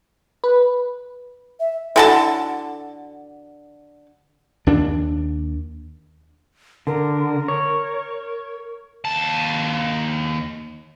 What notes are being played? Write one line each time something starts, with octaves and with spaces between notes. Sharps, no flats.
B4
E5
D3 E4 F#4 A4 G#5 A5
D#2 D4
D3 A#4
C#5
D#2 A5